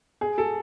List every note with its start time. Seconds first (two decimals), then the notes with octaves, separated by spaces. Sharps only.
0.21 G#4
0.38 A4